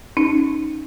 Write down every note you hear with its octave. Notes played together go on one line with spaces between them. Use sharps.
C#4 D#4